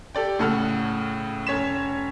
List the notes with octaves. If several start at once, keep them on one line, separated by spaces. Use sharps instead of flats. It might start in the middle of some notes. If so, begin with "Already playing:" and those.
G4 A4 D5 G5
A2 C#3 A4 F#5 E6 F6
F1 C#4 C#5 B6 E7